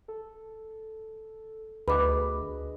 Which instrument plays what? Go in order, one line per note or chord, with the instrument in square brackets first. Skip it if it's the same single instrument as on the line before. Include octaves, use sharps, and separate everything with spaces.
[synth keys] A4
[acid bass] D2 [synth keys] D4 G#4 D#5 [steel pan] B4 [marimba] B5 D6